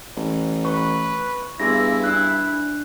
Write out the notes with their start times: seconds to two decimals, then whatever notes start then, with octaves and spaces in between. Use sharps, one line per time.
0.17 A1
0.65 B4 C#6
1.60 G2 B3 E4 G#4 A#6
2.04 D4 F#6